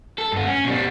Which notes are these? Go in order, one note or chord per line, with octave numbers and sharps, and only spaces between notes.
A4
G2 B3
C#4
B2 G3